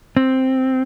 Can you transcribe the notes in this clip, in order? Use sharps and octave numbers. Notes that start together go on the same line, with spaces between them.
C4